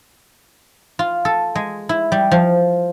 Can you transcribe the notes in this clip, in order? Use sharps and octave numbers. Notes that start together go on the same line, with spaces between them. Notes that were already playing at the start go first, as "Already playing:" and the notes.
F4
A4
G#3
E4
G3
F3